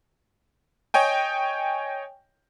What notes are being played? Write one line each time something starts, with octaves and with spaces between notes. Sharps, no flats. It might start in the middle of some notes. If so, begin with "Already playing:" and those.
C#5 D#5 G5 G#5